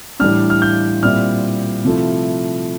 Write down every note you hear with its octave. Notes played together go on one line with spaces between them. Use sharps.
A2 E3 G3 D4 F6
F6
G6
A#2 G3 C4 E4 F6
C3 F3 A3 E4